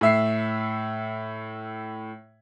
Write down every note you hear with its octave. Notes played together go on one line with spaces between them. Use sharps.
A2 E5 C7